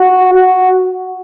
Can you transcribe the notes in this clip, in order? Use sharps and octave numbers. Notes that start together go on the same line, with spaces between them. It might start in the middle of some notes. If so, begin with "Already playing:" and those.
Already playing: F#4
F#4